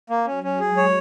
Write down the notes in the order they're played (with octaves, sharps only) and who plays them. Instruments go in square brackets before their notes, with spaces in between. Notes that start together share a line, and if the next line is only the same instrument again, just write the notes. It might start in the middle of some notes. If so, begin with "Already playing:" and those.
[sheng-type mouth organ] A#3
[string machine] F#3 [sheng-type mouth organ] C#4
[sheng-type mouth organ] C#4
[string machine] G#3 [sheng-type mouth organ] G#4
[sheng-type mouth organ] C#5